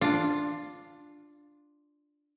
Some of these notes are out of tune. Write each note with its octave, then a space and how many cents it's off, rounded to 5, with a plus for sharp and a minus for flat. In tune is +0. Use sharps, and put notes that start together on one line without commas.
D4 +0 F4 +0